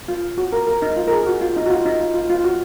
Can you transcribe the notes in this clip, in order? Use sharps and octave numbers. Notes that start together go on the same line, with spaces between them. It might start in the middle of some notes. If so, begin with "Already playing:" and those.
F4
F#4
A#4
A#4
D#4
F4
A#4
G#4
F#4
F4
D#4
F#4
F4
D#4
F4
F4
F4
F#4